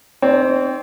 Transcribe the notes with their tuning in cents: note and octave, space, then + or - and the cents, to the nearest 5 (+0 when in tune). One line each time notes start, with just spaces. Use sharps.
C4 +0 D#4 -30 C#5 +45